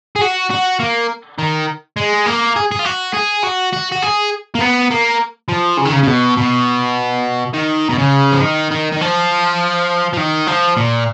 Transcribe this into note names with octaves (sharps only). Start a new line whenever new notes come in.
G#4
F#4
F#4
A#3
D#3
G#3
A#3
G#4
G#4
F4
F#4
G#4
F#4
F#4
F#4
G#4
A#3
B3
A#3
F3
C#3
D#3
C#3
C#3
B2
B2
D#3
B2
C#3
F3
D#3
D#3
D#3
F3
F3
D#3
F3
A#2